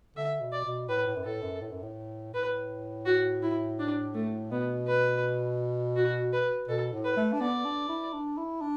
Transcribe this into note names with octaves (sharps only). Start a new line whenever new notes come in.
D3 E5
B2
D5
B2
A2 B4
A2
F#2
A2 A4
F#2
A2
F#2
A2
A2 B4
F#4
E4
D4
A3
B2 B3
B4
F#4
B4
B2 A4
A2
B4
A3
D4
B3 D5
D4
E4
D4
E4
D4